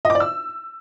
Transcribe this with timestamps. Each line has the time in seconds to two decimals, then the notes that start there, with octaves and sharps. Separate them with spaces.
0.05 D#5
0.10 D6
0.15 D5
0.20 E6